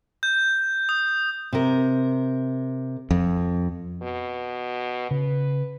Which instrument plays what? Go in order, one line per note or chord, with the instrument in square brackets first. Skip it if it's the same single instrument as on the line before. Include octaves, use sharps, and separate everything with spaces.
[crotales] G6
D#6
[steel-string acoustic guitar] C3 A#4
[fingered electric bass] F2
[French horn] B2
[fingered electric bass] C#3 [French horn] B4